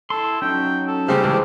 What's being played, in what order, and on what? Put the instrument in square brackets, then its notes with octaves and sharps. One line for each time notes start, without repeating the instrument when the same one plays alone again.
[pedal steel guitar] E4 C6 [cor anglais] A4
[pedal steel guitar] F#3 C#4 D#4 [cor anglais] G5
[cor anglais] A4
[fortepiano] C#3 G3 C4 [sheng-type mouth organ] G4 G#4 C5
[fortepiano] C#2 [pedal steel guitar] E3 G#3 [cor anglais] D4